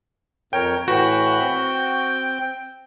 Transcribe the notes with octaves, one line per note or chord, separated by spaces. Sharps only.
F2 A#4 C#5 G5
A2 E3 F#4 G5 B5
C4